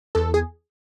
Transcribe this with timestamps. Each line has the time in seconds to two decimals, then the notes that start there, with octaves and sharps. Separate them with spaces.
0.15 E2 A4
0.34 G#4